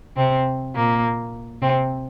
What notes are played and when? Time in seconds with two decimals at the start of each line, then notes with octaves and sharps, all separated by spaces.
0.16 C3 C4
0.75 A#2 A#3
1.61 C3 C4